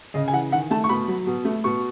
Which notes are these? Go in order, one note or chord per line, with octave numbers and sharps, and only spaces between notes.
C#3 D#5
G#5
E3 F#5
D#3 F#5
A3 A5
C#6
B2 B5
F#3
B2
A3
B2 C#6